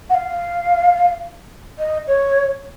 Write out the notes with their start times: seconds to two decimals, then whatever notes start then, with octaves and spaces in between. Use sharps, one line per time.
0.09 F#5
0.14 F5
1.79 D#5
2.07 C#5